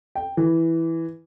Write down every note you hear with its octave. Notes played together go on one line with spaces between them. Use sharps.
G5
E3